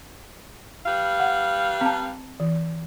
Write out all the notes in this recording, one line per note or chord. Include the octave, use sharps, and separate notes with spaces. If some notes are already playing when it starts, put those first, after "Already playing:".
G3 B4 F5
F#5
C4 A5
E3